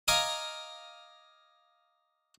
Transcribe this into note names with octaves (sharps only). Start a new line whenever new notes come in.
D#5 F5 G#5 A#5 D6